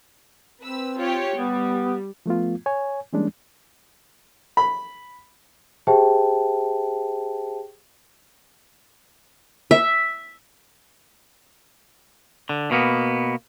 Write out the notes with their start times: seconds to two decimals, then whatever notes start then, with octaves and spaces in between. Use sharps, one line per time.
0.62 C4 B4 E6
0.99 F4 G4 C#5
1.36 G3 B3
2.26 F3 A3 B3 F4
2.66 C#5 G#5
3.13 E3 G3 G#3 A#3 C#4 D4
4.57 B5
5.87 G4 G#4 C5 E5 G5 A5
9.71 E5
12.49 D3
12.71 B2 A#3 B3